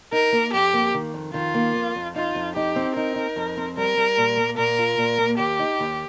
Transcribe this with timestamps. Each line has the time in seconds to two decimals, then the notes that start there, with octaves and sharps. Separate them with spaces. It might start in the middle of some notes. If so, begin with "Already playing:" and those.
0.12 D#4 A#4
0.33 A#3
0.53 F2 G4
0.73 A#3
0.94 D#3
1.14 F2
1.34 D#3 F4
1.54 A#3
1.75 F2
1.95 F2
2.15 D#4 F4
2.35 F2
2.55 D#4 G4
2.76 C4
2.96 D#4 A#4
3.16 D#4
3.36 F2
3.57 C4
3.77 G3 A#4
3.97 G3
4.17 A#2
4.37 A#3
4.57 A#2 A#4
4.79 F4
4.98 A#2
5.18 A#3
5.38 D#2 G4
5.59 D#4
5.80 D#2